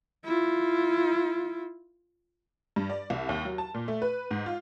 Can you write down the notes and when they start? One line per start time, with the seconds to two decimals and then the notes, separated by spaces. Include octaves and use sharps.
0.25 E4 F4
2.76 G2
2.90 D5
3.10 C2
3.29 D#2
3.45 F#3
3.58 A5
3.74 A#2
3.88 A3
4.02 B4
4.31 G#2
4.46 F4